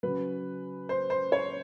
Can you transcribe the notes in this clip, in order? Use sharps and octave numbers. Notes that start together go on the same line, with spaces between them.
C#3 F#3 B4
C5
C5
C#5